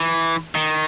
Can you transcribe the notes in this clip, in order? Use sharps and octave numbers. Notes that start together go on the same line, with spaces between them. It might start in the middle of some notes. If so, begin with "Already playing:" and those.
Already playing: E3
D#3